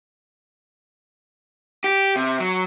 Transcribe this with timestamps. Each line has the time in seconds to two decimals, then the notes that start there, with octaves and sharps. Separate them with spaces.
1.84 G4
2.16 C3
2.40 F#3